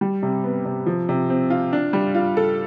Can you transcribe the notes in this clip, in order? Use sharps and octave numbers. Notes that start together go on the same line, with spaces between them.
G3
C3
B3
C3
F3
C3
C4
F4
D4
G3
F4
A4